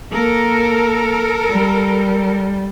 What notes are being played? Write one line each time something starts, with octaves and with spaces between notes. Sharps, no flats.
A#3 A4 A#4
G3